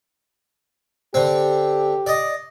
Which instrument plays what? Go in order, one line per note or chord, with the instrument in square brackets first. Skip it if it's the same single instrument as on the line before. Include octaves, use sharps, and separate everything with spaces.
[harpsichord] D3 C4 [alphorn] G4
[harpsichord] D5 D#5